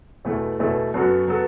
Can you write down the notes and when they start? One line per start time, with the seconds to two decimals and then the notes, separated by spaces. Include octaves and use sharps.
0.25 E2 B2 A3 E4 A4
0.59 E2 B2 A3 E4 A4
0.94 F#2 F#3 B3 F#4 A4
1.28 F#3 B3 F#4 A4